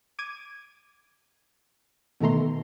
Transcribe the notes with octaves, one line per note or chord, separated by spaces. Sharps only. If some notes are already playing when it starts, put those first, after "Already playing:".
D6 G#6 D#7
B2 D#3 A3 A#5 C6